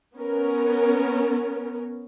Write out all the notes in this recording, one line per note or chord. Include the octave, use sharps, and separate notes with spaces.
B3 C#4 A#4